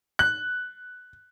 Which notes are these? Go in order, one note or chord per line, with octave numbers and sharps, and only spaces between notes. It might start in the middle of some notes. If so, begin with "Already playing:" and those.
F#6